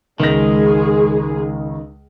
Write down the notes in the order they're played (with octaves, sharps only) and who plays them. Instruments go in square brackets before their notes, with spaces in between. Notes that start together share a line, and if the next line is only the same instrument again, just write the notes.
[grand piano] C#2 A#6 [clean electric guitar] D#3 [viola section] G#3 G#4